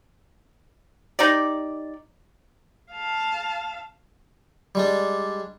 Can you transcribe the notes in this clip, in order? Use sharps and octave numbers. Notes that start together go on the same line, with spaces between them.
D#4 G4 D5
F5 A5
G3 G#3 D4